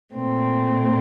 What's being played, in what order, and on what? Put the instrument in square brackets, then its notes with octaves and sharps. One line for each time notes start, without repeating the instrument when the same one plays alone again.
[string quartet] A#2 A3 C4